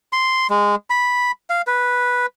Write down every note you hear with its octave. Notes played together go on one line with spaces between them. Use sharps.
C6
G#3
B5
F5
B4